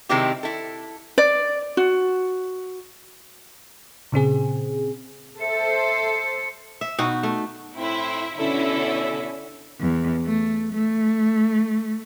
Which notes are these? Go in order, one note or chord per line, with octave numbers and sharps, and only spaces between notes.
C3 D#3 G#3 C4 E4 G4
E4 A4
D5
F#4
A#2 C#3 C4 G#4
A4 C5 E5 C#7
E5
B2 D#4 F#4
A3
A2 C4 E4 C6
B2 D3 C#4 E4 A4
E2
A3
A3